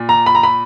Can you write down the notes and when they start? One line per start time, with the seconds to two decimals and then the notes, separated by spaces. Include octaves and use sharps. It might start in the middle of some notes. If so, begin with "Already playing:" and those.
Already playing: A#2
0.09 A#5
0.26 B5
0.35 A#5
0.43 B5